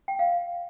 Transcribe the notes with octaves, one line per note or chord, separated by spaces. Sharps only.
G5
F5